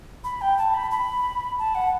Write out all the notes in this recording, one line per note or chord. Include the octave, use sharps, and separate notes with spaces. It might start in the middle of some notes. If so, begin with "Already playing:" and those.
B5
G5
A5
B5
B5
A5
F#5